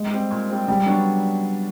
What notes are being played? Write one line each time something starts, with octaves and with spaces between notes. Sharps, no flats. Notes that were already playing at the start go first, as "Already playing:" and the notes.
Already playing: G#3
G3 C4
A#2
G3 C4
C#3 G3
F#3 B3 D4